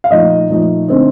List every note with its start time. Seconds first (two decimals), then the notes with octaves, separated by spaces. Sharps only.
0.04 F5
0.11 A#2 F3 A3 D#4 D#5
0.49 A#2 F3 A3 D#4
0.88 D3 A3 C4 D#4